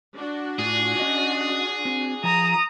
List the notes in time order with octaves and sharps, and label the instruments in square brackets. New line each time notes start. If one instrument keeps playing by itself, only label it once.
[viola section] D4 F#4
[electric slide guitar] A2 F4 [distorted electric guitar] G#4
[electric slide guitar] C#4 D#5
C4
[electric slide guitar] F3 [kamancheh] A#5 D#6